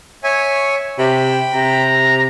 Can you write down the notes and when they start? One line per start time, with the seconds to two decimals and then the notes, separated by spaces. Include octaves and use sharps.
0.24 C#5 E5 G#5
0.99 C3 G5 B5
1.54 C3 A#5